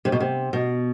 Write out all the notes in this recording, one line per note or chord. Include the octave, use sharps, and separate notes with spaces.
C3
B2
C3
B2